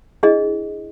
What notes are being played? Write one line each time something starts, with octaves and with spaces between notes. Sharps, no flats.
D4 E4 G#4 D#5